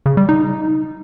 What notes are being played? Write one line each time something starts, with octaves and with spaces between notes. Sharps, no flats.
C#3
G3
D#4